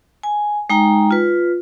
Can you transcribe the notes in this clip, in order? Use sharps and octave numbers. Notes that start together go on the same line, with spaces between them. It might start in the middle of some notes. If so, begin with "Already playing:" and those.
G#5
G#3 D#4 G5 A#5
F4 B4